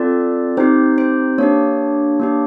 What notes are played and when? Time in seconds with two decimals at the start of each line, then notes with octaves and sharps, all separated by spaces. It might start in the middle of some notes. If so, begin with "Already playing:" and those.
Already playing: C4 F4 A4 D5
0.57 C4 D#4 G4 C5
0.98 C5
1.38 A#3 D4 G4 C#5
2.20 A#3 D4 G4